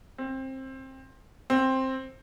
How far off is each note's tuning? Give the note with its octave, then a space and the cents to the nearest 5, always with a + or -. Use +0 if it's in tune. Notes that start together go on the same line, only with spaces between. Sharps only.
C4 +20
C4 +10